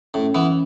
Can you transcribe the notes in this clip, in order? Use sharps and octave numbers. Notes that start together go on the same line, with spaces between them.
A2 C#4
E3 B3